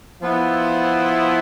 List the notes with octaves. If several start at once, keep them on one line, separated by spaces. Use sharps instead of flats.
F3 B3 E4